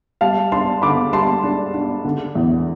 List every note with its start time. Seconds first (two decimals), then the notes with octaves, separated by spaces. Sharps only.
0.21 G3 F5 A5
0.52 D4 A5 C6
0.82 D3 B5 D6
1.13 G3 A5 C6
1.43 D4
1.74 D4
2.04 D3
2.35 E2